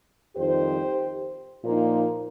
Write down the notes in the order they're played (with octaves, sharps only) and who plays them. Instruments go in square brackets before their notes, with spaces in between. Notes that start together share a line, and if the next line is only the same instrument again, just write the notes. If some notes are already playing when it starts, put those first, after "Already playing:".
[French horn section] F2 D#3 G3 D#4 G4 C5
A#2 F3 A#3 D#4